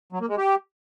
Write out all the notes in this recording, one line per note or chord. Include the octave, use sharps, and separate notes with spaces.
F#3
A#3
G#3
G4